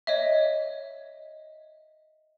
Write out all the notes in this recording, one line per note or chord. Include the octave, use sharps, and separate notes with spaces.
C#5 D#5 E5